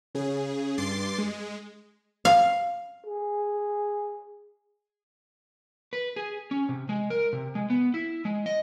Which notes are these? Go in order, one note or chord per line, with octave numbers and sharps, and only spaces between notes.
C#3 G#4
G2 C6 D6 A6 C7
G#3
F5
G#4
B4
G#4
C#4
C3
G#3
A#4
C3
G#3
B3
E4
G#3
D#5